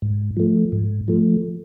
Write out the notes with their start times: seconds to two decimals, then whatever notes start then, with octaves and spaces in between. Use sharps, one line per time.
0.02 G#2
0.37 F3 A3
0.72 G#2
1.08 F3 A3